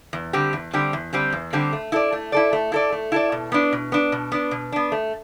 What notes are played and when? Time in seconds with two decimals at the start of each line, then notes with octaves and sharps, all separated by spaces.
0.13 E2
0.33 D3 G3 C4 G4
0.53 E2
0.73 D3 G3 C4 G4
0.93 E2
1.13 D3 G3 C4 G4
1.33 E2
1.53 D3 G3 C4 G4
1.73 A3
1.92 E4 A4 D5
2.12 A3
2.32 E4 A4 D5
2.53 A3
2.72 E4 A4 D5
2.92 A3
3.12 E4 A4 D5
3.32 B2
3.52 B3 D4
3.72 B2
3.92 B3 D4
4.12 B2
4.32 B3 D4
4.51 B2
4.72 B3 D4
4.92 A3